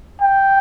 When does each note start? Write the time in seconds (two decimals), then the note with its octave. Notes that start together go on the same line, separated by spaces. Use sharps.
0.22 G5